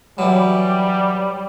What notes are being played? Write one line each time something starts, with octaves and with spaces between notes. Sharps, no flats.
E3 F#3 G3